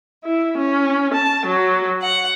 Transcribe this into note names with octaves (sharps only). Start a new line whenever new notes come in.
E4
C#4
A5
F#3
F#5